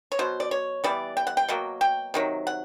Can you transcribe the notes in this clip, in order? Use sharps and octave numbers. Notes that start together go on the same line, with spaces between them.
C#5
B2 F#3 C5
D5
C#5
E3 G3 B3 D5
G5
F#5
G5
B2 F#3 A#3
G5
C3 D#3 F#3
F#5